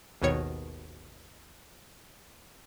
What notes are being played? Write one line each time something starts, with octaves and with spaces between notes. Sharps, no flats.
G#1 D#2 B2 D#3 C#5 C#7